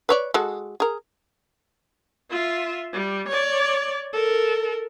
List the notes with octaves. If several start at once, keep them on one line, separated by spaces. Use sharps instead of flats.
B4 C#5 D5
G#3 F#4 A4
G#4 A#4
F4 E5
G3
C#5 D5
A4 A#4